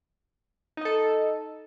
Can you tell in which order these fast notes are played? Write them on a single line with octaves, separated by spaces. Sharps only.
D#4 D#5 A4